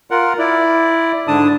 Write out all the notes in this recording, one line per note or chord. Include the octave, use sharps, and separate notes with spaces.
F4 A#4 F#5
E4 D5
G#2 D3 D4 A5 D#6